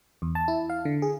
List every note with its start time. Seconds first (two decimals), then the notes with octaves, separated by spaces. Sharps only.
0.22 E2
0.35 A5
0.48 E4
0.70 F5
0.85 D3
1.02 G#4